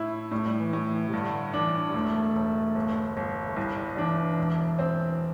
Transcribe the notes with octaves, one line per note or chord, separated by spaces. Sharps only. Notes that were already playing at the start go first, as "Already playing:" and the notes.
Already playing: A2 E4
A2 G3
A3
G3
E3
A2
E3
C3
G2 D3
E3 D4
G3
E1 A3
E1
G1
G1
A3
C2 G3
G3
E3 D4
E1
C4